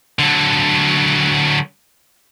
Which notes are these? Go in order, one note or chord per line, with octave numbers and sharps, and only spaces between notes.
D3 F#3